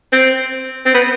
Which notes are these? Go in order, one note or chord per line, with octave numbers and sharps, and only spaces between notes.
C4
C4
B3